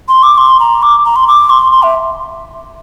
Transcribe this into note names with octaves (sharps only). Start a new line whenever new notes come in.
C6
D6
C6
A#5
D6
A#5
C6
D6
C6
C6
E5